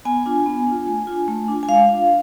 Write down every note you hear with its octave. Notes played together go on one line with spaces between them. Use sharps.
B3 G#5
D4 F4
B3
D4 F4
A3
D4 F4
A3
D4 F4
G#5
G#3 F5
D4 F4